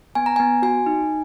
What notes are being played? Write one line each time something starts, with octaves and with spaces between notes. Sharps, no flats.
B3 G#5
A#5
G#5
B3
F#4 G#5
D#4